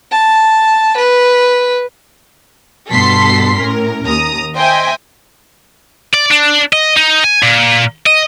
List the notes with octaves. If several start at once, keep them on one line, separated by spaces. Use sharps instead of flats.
A5
B4
G2 B2 A4 C6 B6 C7
A2 C#4 A#4
D#2 A#5 D#6
C5 D#5 E5 G5 G#5
D5
D4
D#5
D#4
G#5
A#2
D#5